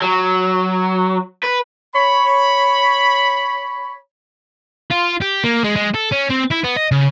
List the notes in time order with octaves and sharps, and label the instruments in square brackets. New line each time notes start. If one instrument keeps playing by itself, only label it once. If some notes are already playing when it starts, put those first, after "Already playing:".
[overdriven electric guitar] F#3
B4
[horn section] C#5 B5
[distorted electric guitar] F4
G4
A#3
G#3
G#3
A4
C#4
C4
E4
B3
D#5
C#3